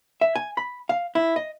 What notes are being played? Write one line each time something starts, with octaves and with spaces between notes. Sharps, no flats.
E5
G#5
B5
F5
E4
D#5